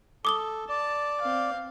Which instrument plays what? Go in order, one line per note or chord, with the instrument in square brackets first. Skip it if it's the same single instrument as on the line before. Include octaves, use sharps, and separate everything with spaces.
[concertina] A4 [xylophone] D6 D#6 G7
[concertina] D5 [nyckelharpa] A5
[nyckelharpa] C4 F5